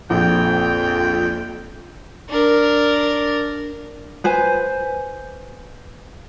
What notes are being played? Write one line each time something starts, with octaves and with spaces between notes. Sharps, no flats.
A#1 F2 G5
D4 A#4
B4 C5 G#5